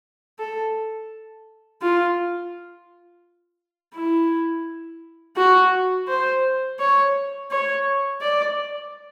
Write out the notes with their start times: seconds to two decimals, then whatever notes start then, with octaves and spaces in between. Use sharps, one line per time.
0.39 A4
1.82 F4
3.95 E4
5.37 F#4
6.08 C5
6.80 C#5
7.51 C#5
8.22 D5